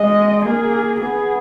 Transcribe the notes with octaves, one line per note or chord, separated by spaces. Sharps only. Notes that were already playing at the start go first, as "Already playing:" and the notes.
Already playing: G#3 D#5
A#3 G#4
B3 G#4